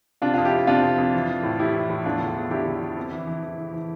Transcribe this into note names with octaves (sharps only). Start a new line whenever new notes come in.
C3 D4 F4
F2 D4 F4
E4 G4
F2
C3 D4 F4
F2
F2
E3
E3
A2
E3 E4 G4
E3
A2
E2 D4 F4
D3
E2
D3 E4 G4
D3
D3
F2
E3
E3
E3
E3
E3